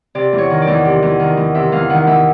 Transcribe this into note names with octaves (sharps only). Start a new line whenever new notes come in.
C3 D5
E2
C#5
D#3
D5
E2
C3
E2
D#3
E2
C3 E5
E2 F5
D#3 F#5
E2 E5